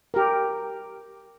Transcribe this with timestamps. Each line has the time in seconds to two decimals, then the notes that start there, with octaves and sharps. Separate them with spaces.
0.14 G4 A#4